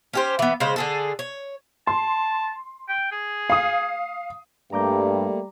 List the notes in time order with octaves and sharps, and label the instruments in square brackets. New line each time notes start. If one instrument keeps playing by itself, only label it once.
[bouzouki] C#4 G4 C5
E3 B3
C#3 G#3 C5
D3 G#4 A4
C#5
[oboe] A5 [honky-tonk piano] C6
[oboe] G5
G#4
[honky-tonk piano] F5 D#6
[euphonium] G2 [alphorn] G3 [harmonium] A3 A#3 [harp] A#5 D6 G6